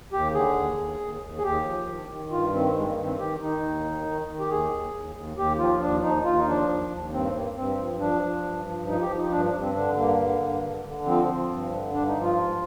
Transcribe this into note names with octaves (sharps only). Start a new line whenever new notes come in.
D#2 G4
D3 G#4
D#2
D#2
D#2
D#2
G#4
D#2 G4
F3
D#3
D#3
G2 F4
D#3 C4
G2 G#3
A#3
D#3
C4
D#3 G4
D#3 D#4
D#2
D#3
D#3
D#3
G4
D#2 G#4
D#2
D#2
D#2
D#2 G4
F3 F4
D#2 D4
D#2 D#4
D#2 F4
D#4
F3 D4
D#2
D#2
G2 C4
G2 A#3
G2 C4
F3
F3 D4
F3
G2
F3
F3 D#4
G4
F3
D#4
G2 D4
D4
G2
C4
D3 D4
G2 A#3
D3
G2
D3
D3
F3 C4
F3
G2
D3
G2 D4
D#4
F3
F4
G#2